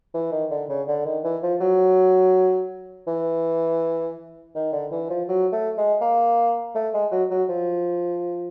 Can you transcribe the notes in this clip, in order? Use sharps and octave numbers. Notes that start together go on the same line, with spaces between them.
E3
D#3
D3
C#3
D3
D#3
E3
F3
F#3
E3
D#3
D3
E3
F3
F#3
A3
G#3
A#3
A3
G#3
F#3
F#3
F3